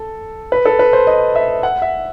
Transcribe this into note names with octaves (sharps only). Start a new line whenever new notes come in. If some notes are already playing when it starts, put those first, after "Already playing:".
Already playing: A4
B4
A4
B4
C5
D#5
E5
F#5
E5